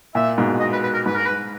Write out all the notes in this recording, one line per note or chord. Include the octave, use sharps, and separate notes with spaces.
A#2 E5
G#2 B2
D#5
B4
B4
A#4
G#2 B4
A#4
B4